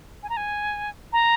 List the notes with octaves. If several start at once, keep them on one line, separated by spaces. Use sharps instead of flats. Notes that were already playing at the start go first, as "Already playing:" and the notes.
G#5
A#5
G#5
A#5